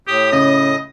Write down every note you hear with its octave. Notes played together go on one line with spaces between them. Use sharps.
A2 G4 D#6
C#3 D#5